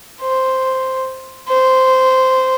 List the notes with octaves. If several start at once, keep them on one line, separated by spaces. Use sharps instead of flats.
C5
C5